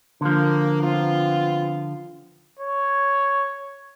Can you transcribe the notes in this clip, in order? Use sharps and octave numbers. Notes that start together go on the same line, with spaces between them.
D3 F3 A#3
B3 C4 F4
C#5